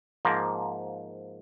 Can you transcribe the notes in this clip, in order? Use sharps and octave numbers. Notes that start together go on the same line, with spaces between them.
G#2 F3 A#3